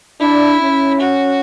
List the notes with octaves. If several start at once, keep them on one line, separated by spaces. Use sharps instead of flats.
D4 E4
C#4
F#4